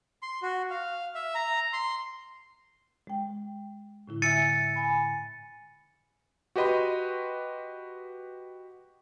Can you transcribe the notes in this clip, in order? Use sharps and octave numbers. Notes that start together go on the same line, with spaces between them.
C6
F#4
F5
E5
A#5
C6
G#3 G5
A2 D3 E4
E5 G#5 E6 A6 C#7 D#7
G#5 B5
F#4 G4 B4 D#5 B5 C6